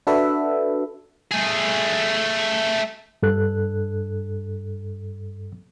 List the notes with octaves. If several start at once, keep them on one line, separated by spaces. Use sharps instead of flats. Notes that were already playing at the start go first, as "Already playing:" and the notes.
D4 F#4 A4 B4 E5
A3 G#4
G2 A4 F#6